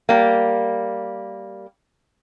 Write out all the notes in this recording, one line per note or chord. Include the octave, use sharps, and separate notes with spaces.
G3 A#3